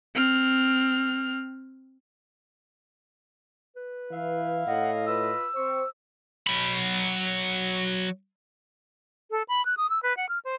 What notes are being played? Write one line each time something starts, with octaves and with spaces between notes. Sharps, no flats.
C4 F6
B4
E3 E4 E5 F5
A2 D#5 F#5
F4 B4 E6
C4 C5 C#6
F#3 B5
A4
B5
F#6
D#6
E6
B4
F#5
F6
C5